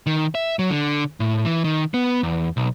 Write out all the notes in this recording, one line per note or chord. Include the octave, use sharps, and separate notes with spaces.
D#3
E5
F#3
D3
A2
E3
D#3
B3
E2
B1